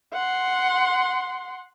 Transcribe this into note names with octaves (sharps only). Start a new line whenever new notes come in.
F#5 C6